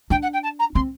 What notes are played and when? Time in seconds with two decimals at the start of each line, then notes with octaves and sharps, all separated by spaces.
0.10 D4 G5
0.22 F#5
0.33 G5
0.43 A5
0.59 A#5
0.75 C4 C6